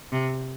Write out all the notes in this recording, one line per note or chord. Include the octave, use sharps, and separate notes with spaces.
C3